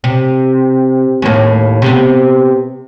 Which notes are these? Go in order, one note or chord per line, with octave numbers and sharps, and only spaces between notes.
C3
D#2 A2
C3 B3